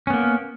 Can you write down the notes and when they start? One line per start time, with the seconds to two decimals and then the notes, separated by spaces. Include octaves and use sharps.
0.07 C#4
0.10 B3
0.13 A#3